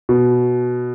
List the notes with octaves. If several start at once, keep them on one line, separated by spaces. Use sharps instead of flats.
B2